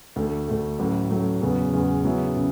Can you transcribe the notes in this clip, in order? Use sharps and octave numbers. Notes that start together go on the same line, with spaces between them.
D2 D3 A3
D2 D3 A3
A1 A2 F#3 A3
A1 A2 F#3 A3
E2 C#3 F#3 B3
E2 C#3 F#3 B3
F#2 C#3 F#3 B3 E4
C#3